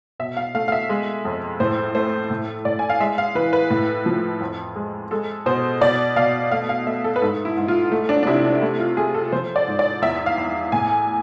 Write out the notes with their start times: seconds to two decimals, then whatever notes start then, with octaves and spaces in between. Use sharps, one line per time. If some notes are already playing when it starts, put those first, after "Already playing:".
0.20 B2 E5
0.37 F5
0.55 A3 F5
0.68 F5
0.72 E5
0.90 G#3
1.25 F2
1.60 A2 C5
1.95 A3 C5
2.30 A2
2.65 A2 D5
2.79 G#5
2.90 F5
3.00 G#3 E5
3.18 F5
3.35 E3 B4
3.53 B4
3.70 A2
4.06 F3
4.41 F2
4.76 G#3
5.11 G#3 A4
5.46 B2 C5
5.81 B2 D5
6.16 B2 F5
6.51 A3 F5
6.69 F5
6.87 A3 E5
7.04 A4
7.16 B4
7.22 G#2 A4
7.45 E4
7.57 G#2
7.68 F4
7.92 A3
8.09 D4
8.23 D4
8.27 C3 E4
8.45 D4
8.62 A3 E4
8.80 F4
8.97 A3 G#4
9.15 A4
9.32 F3 C5
9.56 D5
9.67 G#2
9.79 D5
10.02 E2 E5
10.26 F5
10.38 E2
10.72 A2 G#5